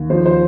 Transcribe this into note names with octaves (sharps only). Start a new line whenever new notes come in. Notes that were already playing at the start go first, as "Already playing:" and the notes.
Already playing: D#2
F3 C5
C5